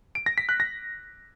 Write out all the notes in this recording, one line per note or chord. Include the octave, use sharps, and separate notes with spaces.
D7
A#6
B6
F#6
A#6